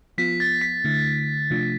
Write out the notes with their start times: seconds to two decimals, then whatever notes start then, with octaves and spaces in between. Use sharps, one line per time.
0.18 F3 B3 F4 B6
0.40 A6
0.61 B6
0.84 D3 A3 E4
1.50 C3 F3 A3 D4 F4